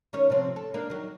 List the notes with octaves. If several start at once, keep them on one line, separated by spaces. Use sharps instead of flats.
D#3 C#4 C#5
C3 F3 C4
A4
A#3 D4
D#3 F#3